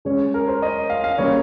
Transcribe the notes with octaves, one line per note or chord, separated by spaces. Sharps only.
C#3 G#3 C#4 C#5
A#4
C5
D#5
F5
F5
C#3 G3 A#3 C#4 C#5